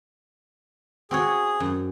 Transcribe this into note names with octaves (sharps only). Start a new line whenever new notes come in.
C4 F#4 G#4 C#5
F#2